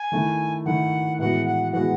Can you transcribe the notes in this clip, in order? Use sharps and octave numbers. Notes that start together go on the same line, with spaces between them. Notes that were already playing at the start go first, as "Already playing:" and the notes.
Already playing: G#5
D#3 A3 E4
D#3 A3 E4 F#5
A2 E3 G#3 B3 F#4 F#5
F#5
A2 E3 G#3 B3 F#4 F#5